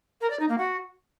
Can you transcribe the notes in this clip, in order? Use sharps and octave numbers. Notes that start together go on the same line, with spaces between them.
A#4
D5
D#4
A#3
F#4